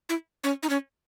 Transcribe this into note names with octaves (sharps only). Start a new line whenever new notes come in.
E4
C#4
D#4
C#4